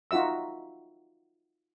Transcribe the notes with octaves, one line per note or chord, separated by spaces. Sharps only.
D#4 F4 F#4 E5 E6